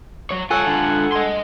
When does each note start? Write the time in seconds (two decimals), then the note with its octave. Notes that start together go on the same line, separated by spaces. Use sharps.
0.31 F#3 C#5
0.50 F4 A4 C#5 F#5 G#5
0.66 D3 F4
1.12 D#5 C6